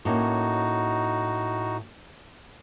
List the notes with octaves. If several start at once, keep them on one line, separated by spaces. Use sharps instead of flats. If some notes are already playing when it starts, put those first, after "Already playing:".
A2 A#3 C#4 D#4 F#4